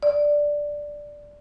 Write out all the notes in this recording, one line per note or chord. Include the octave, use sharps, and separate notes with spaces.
D5